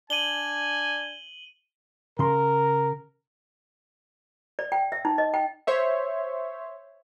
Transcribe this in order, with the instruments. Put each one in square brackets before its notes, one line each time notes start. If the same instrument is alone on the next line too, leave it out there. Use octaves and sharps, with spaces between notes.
[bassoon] D4 [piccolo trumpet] G#5 [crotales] D#7 F#7 G7
[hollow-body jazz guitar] C#3 C6 [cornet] A#4
[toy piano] D5
G5
E5
D#4
D#5
G5
[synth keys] C5 C#5 E5